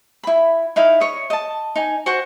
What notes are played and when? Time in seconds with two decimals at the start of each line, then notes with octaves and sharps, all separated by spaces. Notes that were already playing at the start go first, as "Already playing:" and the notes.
0.23 E4 B5
0.76 D#4 E4 F5
1.00 C#5 D#5
1.30 D#5 A5
1.76 D#4 G#5
2.06 F#4 C5 F#5 C#6